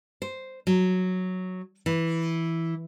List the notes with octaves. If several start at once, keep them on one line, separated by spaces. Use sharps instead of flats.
C5
F#3
E3